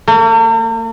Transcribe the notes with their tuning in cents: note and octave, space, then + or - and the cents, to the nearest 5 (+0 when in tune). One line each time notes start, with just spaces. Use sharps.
A#3 -45